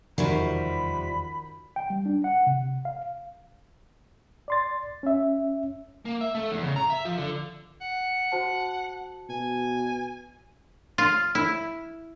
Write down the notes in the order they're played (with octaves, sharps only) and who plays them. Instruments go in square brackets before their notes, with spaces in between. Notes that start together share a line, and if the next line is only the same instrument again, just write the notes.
[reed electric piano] E2 [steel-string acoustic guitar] C3 F3 G3 [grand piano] D#3 F#4 A#4 [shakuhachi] B5
[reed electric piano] G5
G3
D4
F#5
C3
F5
D5 C6 A6
C#4 E5
[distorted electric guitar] A#3
E5
A3
E2
C#3
A#5
E5
F3
D3
[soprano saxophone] F#5
[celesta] F#4 C5 A5
[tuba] B2 [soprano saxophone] G#5
[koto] F4
E4